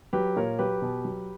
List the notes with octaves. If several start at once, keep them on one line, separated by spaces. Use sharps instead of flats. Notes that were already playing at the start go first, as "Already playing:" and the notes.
F#3 G4 B4
A#2 A#4 C#5
F#3 G4 B4
B2
F#3